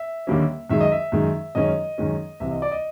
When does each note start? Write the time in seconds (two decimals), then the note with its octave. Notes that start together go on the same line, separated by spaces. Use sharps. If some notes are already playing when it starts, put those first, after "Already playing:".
Already playing: E5
0.27 D#2 D3 G3 A#3 C#4
0.70 F#2 D#3 G#3 E5
0.81 D#5
0.92 E5
1.12 F#2 D#3 G#3
1.55 F#2 D#3 G#3 C#4 D#5
1.98 F#2 D#3 G#3 C#4
2.40 C2 C3 E3 E5
2.51 D#5
2.62 D5
2.71 D#5